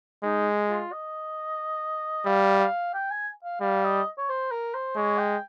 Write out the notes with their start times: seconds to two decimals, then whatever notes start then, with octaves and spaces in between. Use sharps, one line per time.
0.24 G#3 D#4
0.69 F4
0.92 D#5
2.26 G3 F5
2.60 F5
2.94 G5
3.11 G#5
3.44 F5
3.61 G3 F5
3.84 D#5
4.18 C#5
4.29 C5
4.51 A#4
4.74 C5
4.96 G#3 C#5
5.18 G5